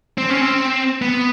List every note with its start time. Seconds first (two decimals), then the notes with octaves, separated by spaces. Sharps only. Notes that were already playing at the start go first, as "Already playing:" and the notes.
0.18 C4
0.30 C#4
0.41 C4
1.02 B3